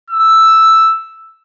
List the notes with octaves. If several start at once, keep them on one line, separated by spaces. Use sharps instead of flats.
E6